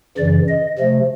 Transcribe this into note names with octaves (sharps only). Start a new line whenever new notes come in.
F#2 C#3 E3 D5
D#5
C3 F3 A3